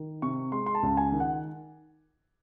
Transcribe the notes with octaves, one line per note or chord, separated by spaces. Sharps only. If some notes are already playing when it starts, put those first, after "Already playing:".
Already playing: D#3
C3 C#6
G#3 C6
C6
A5
C#2
G#5
D#3
F#5